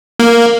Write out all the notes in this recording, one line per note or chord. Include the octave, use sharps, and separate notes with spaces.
A#3